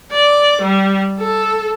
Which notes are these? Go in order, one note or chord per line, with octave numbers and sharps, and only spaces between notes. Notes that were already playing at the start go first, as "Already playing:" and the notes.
D5
G3
A4